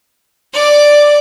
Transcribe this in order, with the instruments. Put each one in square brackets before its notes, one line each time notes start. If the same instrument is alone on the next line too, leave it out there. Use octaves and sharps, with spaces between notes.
[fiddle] D5 D6